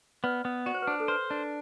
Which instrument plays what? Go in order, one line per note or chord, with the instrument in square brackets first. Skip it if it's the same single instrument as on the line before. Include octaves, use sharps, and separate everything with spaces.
[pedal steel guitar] B3 [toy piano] B4 D5
[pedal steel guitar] B3
[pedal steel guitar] F#4 [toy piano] D5
[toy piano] C5
B4
[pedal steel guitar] D4 [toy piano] C5
[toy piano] A4
[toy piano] B4 [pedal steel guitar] C5
[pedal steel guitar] D4